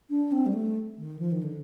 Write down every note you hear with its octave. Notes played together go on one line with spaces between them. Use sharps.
D4
C4
G3
A3
D#3
F3
D#3
D3